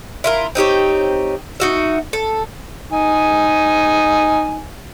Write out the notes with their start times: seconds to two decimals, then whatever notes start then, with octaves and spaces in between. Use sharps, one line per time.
0.24 E4 F4 A#4
0.55 C4 D#4 G4 C#5
1.60 D#4 F#4 E5
2.13 A4
2.92 D#4 G#5